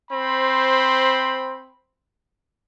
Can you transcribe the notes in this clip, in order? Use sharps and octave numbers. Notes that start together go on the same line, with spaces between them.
C4 C5 B5